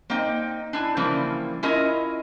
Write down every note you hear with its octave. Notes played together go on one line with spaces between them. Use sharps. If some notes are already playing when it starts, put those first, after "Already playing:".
A#3 C4 D#4 G5
D4 E4 G#5
C#3 E3 F3 G3 A#3 C4
C#4 E4 F4 A#4 D#5